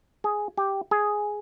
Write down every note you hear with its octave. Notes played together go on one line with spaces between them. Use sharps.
G#4
G4
G#4